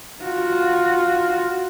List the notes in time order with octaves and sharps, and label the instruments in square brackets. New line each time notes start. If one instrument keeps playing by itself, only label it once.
[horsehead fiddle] F4 F#4